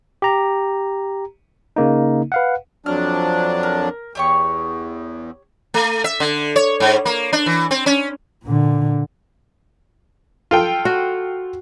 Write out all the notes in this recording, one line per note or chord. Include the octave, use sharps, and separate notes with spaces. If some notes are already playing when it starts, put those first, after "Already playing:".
G4 A#5
C#3 A#3 D#4
B4 F5 F#5
F2 F#3 D4 F6
A#4
E2 G4 C#5 C#6
A3
E5
D3
C#5
G#2
A#3
D4
E3
C4
C#4
A#2 D3
F4 A4 G5
F#4